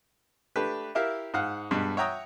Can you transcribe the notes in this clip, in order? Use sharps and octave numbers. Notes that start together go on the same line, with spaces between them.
A3 D4 G4 B4
E4 G4 A#4 E5 F5
G#2 F5 F#5
G2 B2 G3 G#3
C#5 E5 F#5 G5 A#5 D#6